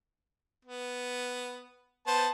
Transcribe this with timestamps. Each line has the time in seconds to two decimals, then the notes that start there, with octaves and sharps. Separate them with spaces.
0.65 B3
2.07 B3 C5 A5